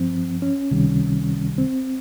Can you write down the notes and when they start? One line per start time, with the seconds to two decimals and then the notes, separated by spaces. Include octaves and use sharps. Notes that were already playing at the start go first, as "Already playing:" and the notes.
Already playing: G2 F3 C4
0.42 C#4
0.71 C#2 C3 D#3 G3
1.58 C4